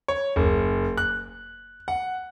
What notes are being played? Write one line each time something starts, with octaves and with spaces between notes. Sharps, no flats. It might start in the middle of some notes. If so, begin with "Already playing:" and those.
C#5
F#1
F#6
F#5